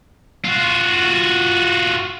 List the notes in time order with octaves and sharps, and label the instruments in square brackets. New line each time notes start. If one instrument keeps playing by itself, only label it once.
[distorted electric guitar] F4 F#4